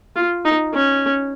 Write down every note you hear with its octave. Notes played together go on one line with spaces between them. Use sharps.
F4
D#4
C#4